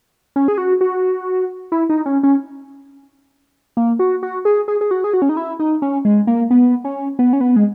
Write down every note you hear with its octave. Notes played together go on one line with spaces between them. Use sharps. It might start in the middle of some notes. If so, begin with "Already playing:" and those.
C#4
G#4
F#4
F#4
E4
D#4
C#4
C#4
A#3
F#4
F#4
G#4
G#4
G#4
F#4
G#4
F#4
C#4
D#4
E4
D#4
C#4
G#3
A#3
B3
C#4
B3
C#4
B3
G#3